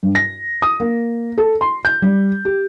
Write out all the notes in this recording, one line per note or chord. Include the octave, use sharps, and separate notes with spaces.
G2
A#6
D#6
A#3
A4
C6
G6
G3
G4